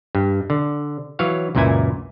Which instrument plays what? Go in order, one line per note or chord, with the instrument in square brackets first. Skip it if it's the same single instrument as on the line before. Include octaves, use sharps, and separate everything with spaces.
[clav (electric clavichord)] G2
D3
E3 F#3 C#5 F5
C#2 F#2 A#2 E3 E4 G#5